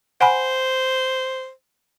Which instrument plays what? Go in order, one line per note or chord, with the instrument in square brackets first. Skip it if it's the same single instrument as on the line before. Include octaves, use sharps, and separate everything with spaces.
[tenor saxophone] C5 [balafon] F#5 G#5 B5